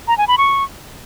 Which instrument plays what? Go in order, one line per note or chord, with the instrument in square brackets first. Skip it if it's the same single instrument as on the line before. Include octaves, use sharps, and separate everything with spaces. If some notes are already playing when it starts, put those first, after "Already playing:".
[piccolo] A#5
G#5
B5
C#6